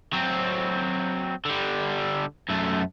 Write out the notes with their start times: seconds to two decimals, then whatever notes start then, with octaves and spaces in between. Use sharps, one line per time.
0.13 F#3 C4
1.45 D3 G3
2.50 F#2 A3